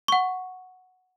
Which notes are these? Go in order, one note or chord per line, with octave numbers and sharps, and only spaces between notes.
F#5 C#6